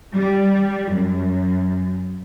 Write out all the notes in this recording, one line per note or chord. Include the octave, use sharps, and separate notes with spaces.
G3
F#2